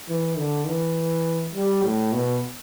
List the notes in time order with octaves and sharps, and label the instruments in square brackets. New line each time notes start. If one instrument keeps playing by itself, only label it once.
[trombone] E3
D3
E3
G3
A2
B2